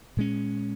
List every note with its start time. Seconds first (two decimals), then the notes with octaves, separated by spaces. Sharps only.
0.17 A#2 G#3 C#4